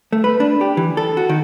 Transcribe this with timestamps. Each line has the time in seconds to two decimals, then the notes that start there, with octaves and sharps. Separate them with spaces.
0.12 A3
0.24 B4
0.40 D4
0.61 G4
0.77 E3
0.97 A4
1.17 F#4
1.29 D#3